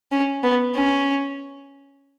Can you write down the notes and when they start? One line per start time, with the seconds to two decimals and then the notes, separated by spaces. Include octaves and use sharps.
0.12 C#4
0.43 B3
0.74 C#4